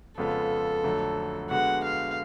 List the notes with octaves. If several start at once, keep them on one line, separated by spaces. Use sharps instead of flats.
F2 C#3 G#3 B3 F4 A4
F2 D3 F#3 A3
D3 G#3 B3 F#4 F#5
F5